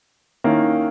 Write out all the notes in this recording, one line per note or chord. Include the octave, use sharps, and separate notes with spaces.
D#3 A#3 C#4 E4